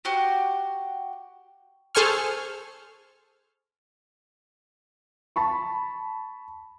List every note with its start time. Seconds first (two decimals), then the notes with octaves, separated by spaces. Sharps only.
0.05 F#4 G4
1.95 G#4 A4 C5 G#5 C#6 F6
5.36 A5 B5 C#6